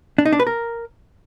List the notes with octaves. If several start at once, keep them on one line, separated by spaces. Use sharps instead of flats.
D4
D#4
D4
B4
A#4